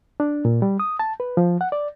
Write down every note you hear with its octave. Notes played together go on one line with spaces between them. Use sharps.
D4
A#2
G3
D#6
A5
B4
F3
F#5
D5